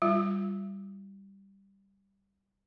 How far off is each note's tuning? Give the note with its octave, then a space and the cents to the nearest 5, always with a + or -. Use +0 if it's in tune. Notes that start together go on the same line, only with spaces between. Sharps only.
G3 +0 F4 +0